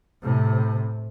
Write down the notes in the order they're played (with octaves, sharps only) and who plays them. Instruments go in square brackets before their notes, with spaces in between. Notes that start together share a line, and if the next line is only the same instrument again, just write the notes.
[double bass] A2 C3